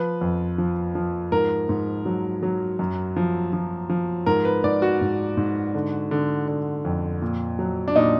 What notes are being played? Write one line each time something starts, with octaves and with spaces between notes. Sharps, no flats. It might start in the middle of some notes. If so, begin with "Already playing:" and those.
Already playing: F3 B4
F2
F3
F3
G#2 A#4
G#2
F#3
F#3
F#2
F3
F3
F3
G#2 A#4
B4
G#2 D5
F#4
G#2
G#2
D3
D3
D3
F2
A#2
F#3
D4
A#2 D#4